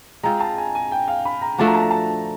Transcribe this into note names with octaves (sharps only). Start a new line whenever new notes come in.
G#3 C4 F4 A#5
A5
G#5
G#5
G5
F5
B5
A#5
F3 A3 D4 F#4 A5
A#5
A5
A#5
A5